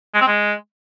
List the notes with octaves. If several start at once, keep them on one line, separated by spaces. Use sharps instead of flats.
G#3
C4
G#3